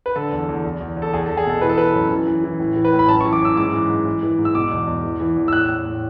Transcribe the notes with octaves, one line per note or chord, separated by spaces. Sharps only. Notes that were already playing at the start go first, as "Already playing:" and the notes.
B4
D3 A4
E2
E2
E2
E2
E2
A4
E2 G#4
A4
E2
G#4
B2 A4
E3 B4
A4
E3 B4
F#2
E3
E3
E3
A2
E3
B4
A2
B5
F#2 A5
C#6
E3
D6
F#2 E6
G#2 D6
E3
G#2
E3
E3
G#2
E6
B2 D6
E2
E2
E3
E3
E2
E6
A2 F#6
A2
A2